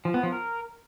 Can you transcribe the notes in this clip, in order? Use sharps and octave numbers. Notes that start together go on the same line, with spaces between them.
F3
B3
F3
A#4